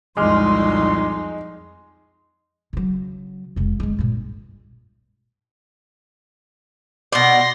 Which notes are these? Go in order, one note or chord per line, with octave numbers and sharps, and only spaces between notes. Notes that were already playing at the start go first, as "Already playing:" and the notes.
C2 F2 A#2 G#3 D#4 C6 D6 F6
C#3 F#3
F1 C#2
D3 G#3
G2 A#2
B2 D5 C6 A#6